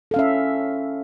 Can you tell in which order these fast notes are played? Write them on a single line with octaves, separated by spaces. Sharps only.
A4 F5 C#4 E5